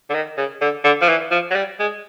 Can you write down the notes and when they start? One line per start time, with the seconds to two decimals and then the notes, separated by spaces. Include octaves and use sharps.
0.10 D3
0.14 D#3
0.38 C#3
0.61 D3
0.84 D3
1.02 F3
1.09 E3
1.31 F3
1.51 F#3
1.55 G3
1.79 G#3